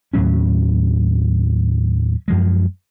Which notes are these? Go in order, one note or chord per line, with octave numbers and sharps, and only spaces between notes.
D#2 A2 F#3 C#4
F#2 F3 G#3